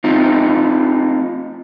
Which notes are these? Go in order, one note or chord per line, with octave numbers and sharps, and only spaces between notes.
C4 D#4 F4